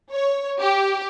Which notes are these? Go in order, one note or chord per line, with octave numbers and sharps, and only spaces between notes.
C#5
G4